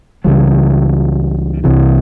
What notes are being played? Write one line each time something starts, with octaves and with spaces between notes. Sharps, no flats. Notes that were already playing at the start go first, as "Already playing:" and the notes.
C#2 C#3 E3 G3
C2 C3 E3